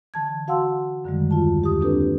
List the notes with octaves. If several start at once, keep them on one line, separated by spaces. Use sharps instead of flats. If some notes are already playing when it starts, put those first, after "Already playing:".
D3 E3 A5 G#6
F#4 F5 F#5 A5 C6 E6
F#2 D3 D#3 G3 G#3
D#2 F4 A5
E2 G4 D#6
A#3 C4 D4 G4 A4 B4